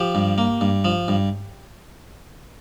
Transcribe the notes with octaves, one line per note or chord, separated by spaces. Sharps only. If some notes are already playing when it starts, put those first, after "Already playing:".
Already playing: F3 G4
G2
A#3
G2
F3
G2